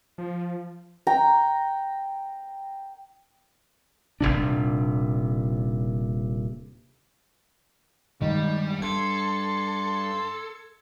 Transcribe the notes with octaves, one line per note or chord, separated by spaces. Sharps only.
F3
G5 A#5
D#1 A#1 C3 D4
G2 D#3 G3 G#3
G2 A4 C6 G#6